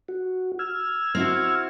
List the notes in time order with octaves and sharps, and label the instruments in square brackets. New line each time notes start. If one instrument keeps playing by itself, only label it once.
[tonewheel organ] F#4
E6 F6 G#6
[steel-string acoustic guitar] C4 E4 F#4